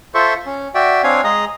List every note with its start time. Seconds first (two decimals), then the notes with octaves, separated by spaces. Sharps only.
0.14 F4 A4 C5 E5 C#6
0.46 C#4
0.75 F#4 D5 E5 G5
1.04 C4 D4 C#5 F5 G#5
1.24 G#3 G#4 D#5 A#5 D#6